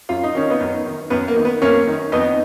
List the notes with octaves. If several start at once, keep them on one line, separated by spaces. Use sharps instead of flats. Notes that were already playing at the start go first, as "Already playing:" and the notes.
F#2 F4
D#4
D#3 C#4
B3 D#4
F#2
D#3
F#2 B3
A#3
D#3
B3
F#2 A#3 C#4
D#3
F2 B3 D#4